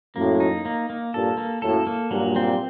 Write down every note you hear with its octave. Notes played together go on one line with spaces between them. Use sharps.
F#2 A2 A#3
D#4
A#3
A#3
G2 A#2 A4
A#3
F#2 A2 A4
A#3
G2 A#2 F#3
C4